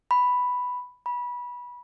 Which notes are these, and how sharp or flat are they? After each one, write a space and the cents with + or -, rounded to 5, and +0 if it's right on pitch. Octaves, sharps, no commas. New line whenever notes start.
B5 +5
B5 -20